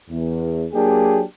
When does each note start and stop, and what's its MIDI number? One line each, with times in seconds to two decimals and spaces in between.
0.10 0.65 40
0.73 1.22 54
0.73 1.22 58
0.73 1.22 62
0.73 1.22 67
0.73 1.22 68